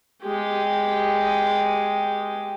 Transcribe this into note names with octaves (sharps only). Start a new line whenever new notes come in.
G#3 G4